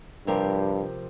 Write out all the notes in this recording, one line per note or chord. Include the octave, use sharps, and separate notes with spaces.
G2 C3 F3 C4 G4 A#4